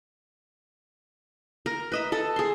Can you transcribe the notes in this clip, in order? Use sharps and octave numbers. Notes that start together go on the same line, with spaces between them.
A#4
B4 D#5 E5
A4 D#5 A5
G#4 C6